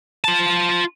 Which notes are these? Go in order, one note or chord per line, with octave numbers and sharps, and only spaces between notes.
F4 A5